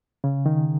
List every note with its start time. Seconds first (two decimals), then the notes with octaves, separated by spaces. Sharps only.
0.24 C#3
0.46 D#3